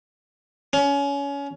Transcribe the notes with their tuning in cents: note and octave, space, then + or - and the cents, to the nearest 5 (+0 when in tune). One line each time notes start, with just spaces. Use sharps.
C#4 +25